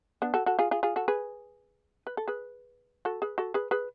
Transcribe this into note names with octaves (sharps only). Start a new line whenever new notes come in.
B3 D4
F#4 A4
F#4 A4
F4 G#4
F4 G#4
F4 G#4
F#4 A4
G#4 B4
B4
A4
G#4 B4
F#4 A4
G#4 B4
F#4 A4
G#4 B4
G#4 B4